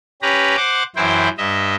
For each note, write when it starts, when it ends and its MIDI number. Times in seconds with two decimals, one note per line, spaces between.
0.22 0.56 61
0.22 0.56 67
0.22 0.56 71
0.22 0.56 82
0.57 0.83 72
0.57 0.83 78
0.57 0.83 86
0.96 1.29 42
0.96 1.29 52
0.96 1.29 64
0.96 1.29 72
0.96 1.29 79
1.38 1.76 43
1.38 1.76 75
1.38 1.76 76